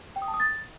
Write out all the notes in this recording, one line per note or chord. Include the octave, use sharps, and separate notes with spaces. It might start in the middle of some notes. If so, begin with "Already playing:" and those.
G5
D#6
A5
D#6
A6